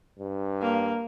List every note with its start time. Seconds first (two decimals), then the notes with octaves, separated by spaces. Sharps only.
0.19 G2
0.62 A#3